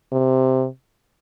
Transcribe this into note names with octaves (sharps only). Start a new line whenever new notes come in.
C3